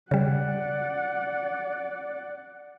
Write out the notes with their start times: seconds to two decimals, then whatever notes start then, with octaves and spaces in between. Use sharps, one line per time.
0.11 C#3 G3 D5 F#5